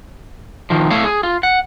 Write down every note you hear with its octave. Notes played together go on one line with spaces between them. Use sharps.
D#3 F3
A3 E4 C#5 F5
G#4
F4
F#5